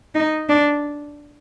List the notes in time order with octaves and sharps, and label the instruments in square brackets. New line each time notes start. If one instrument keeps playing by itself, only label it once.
[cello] D#4
D4